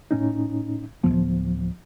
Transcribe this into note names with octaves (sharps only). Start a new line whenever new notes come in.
A2 C#4 D#4
D1 E2 F3 B3